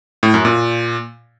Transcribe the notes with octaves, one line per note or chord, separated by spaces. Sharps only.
A2
F#2
A#2